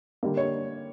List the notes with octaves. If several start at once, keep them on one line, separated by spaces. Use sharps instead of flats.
D3 G3 A#3
C#5